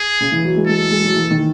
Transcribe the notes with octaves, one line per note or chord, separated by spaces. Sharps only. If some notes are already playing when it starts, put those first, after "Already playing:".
Already playing: G#4
C#3
E3
F#3
G#3
G#3 A4
G#3
F#3
E3
D#3